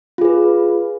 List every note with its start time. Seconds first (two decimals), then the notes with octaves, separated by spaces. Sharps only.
0.18 F4
0.21 G#4
0.25 B4